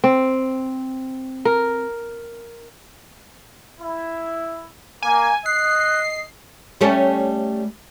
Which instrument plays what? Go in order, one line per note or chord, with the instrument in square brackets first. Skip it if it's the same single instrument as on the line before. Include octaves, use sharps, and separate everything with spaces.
[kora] C4
A#4
[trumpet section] E4
[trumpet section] A#3 [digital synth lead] G#5
[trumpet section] D#5 [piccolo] F#6 [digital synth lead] C7
[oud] G3 A3 C#4